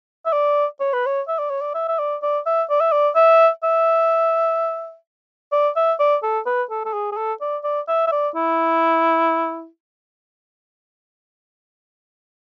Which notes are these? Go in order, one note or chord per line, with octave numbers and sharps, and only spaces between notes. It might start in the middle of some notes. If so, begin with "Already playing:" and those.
E5
D5
C#5
B4
C#5
E5
D5
C#5
D5
E5
E5
D5
D5
E5
D5
E5
D5
E5
E5
D5
E5
D5
A4
B4
A4
A4
G#4
G#4
A4
D5
D5
E5
E5
D5
E4